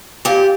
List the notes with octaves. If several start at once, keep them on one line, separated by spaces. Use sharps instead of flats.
A#2 G4